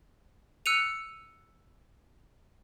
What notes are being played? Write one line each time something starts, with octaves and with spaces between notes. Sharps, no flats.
E6 F#6 C#7 D#7 F7